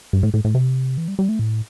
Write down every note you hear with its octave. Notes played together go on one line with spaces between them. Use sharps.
G2
A2
A2
A2
C3
E3
G3
G3
A3
A2